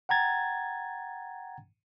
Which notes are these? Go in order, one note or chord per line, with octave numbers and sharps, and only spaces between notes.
F#5 G5 A#5 G#6 A6